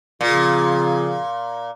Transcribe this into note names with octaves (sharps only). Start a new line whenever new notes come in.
A#2 C#3 F3 C4 F4 G#4